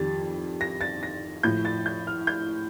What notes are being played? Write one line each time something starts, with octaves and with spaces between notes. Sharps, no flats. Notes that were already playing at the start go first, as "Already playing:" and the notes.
Already playing: F2 D#3 G3 A6
A#6
A6
A#6
A2 F3 G6
A6
G6
F6
G6